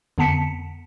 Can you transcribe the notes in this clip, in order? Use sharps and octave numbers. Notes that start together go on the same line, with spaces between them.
F2 D3 B3 A5 B6 C#7